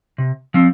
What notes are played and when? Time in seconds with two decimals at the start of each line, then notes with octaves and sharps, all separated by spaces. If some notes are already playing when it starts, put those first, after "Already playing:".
0.18 C3
0.54 F3 C4